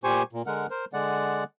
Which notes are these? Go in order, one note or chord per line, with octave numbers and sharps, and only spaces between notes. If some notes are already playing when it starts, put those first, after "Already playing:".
A#2 G4 C5 G#5 C#6
A#2
D3 G#3 A#4 F#5
A#4 C5
D3 G#3 D5 F#5